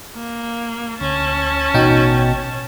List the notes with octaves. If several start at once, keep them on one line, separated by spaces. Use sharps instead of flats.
A#3
D2 C#4 A5
A1 B2 D#4 G5